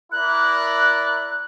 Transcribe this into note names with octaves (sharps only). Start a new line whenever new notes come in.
E4 A#4 D5 F#6